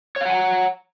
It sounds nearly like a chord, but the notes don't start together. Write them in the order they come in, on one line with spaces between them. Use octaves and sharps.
C#5 F5 F#5 G#5 A#5